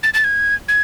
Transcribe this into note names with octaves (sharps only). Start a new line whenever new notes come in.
A6
A6
G#6
G#6